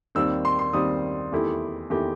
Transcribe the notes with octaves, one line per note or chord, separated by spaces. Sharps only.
D#2 D#3 G3 C4 E6
C6
C6
D#2 D#3 G3 C4 D#6
E2 D#3 A3 E4 G4
E2 D#3 A3 E4 G4